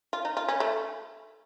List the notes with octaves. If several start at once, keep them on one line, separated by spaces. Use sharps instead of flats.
F4
D#4
F4
C#4
A3